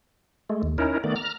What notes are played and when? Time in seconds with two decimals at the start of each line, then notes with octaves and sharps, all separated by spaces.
0.49 G#3 A3
0.63 D#2
0.78 C#4 D#4 E4 A#4
1.04 D#3 A3 B3 D5
1.16 A#5 F6